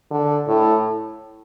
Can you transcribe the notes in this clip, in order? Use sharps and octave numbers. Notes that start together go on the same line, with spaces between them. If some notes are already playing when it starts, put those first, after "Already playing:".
D3
A2